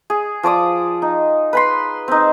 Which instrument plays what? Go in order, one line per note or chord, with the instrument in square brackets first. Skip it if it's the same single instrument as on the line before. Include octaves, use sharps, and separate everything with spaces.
[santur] G#4
F3 D5 D6 D#6
D#4
B4 B5 C6
C4 D#4